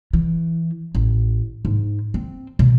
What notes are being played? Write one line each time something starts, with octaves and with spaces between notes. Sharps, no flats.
E3
A1
G#2
C4
B2